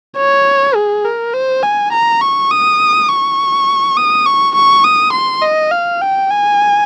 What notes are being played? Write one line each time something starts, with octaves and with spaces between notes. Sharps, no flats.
C#5
G#4
A#4
C5
G#5
A#5
C#6
D#6
C#6
D#6
C#6
C#6
D#6
C6
D#5
F5
G5
G#5